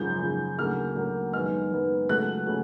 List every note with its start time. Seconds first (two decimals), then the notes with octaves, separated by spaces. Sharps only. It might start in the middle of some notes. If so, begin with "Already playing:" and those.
Already playing: G#1 F#2 C#3 F3 G6
0.21 G#1 F#2 C#3 F3
0.58 D2 C#3 F#3 A#3 F6
0.95 D2 C#3 F#3 A#3
1.33 F#2 D#3 G#3 B3 F6
1.71 F#2 D#3 G#3 B3
2.08 C#2 C#3 F#3 A3 F#6
2.47 C#3 F#3 A3